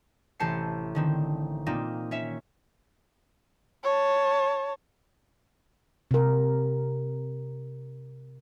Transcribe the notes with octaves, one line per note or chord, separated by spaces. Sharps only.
A1 C3 A5 G6 C7 C#7
D3 D#3 C4
A#2 A#3 C4 D#4
C#4 C#5 E5 E7
C#5 A5
C3 A#4